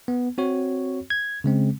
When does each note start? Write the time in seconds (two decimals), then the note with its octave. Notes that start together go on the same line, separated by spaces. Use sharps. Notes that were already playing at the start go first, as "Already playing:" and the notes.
0.08 B3
0.38 C4 F#4 C#5
1.10 G#6
1.44 C#3 G#3 C4